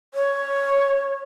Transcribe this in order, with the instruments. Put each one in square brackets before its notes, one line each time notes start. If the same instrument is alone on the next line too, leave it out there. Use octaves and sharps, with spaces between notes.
[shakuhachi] C#5